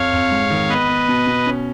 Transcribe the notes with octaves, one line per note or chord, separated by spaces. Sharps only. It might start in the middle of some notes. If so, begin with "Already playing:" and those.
Already playing: F2 C#5 F5
F2
G#2
D#3
B3 B4 D#5
B3
B2
B2
C#4